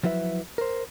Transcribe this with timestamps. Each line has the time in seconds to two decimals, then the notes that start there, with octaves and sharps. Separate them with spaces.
0.04 F3 F#3 E4 B4 E5
0.58 A#4 C5